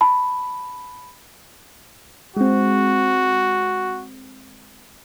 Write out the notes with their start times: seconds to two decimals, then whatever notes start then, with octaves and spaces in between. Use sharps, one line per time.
0.01 A5 B5
2.36 G#3 C4 F#4